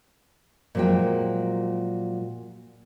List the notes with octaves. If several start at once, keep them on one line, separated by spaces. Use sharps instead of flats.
A#2 F3 F#3 G#3 G5